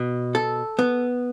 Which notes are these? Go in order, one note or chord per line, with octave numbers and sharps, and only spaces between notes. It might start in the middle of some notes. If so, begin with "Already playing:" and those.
Already playing: B2
A4
B3